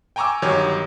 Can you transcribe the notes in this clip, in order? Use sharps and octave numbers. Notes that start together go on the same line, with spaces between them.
G5 G#5 A#5 C#6 D6 E6
G1 D#3 F#3 G4 C#5